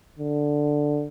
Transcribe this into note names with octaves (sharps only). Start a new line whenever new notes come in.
D3